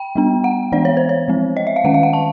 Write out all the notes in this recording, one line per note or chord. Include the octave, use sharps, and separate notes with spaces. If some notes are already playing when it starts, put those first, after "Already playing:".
Already playing: G5
G3 B3 D4
F#5
E3 G#3 B3 D4 D5
C#5
C5
C#5
F3 G#3 C4
D#5
E5
F5
D#3 G#3 C#4 F#5
F5
F#5
A5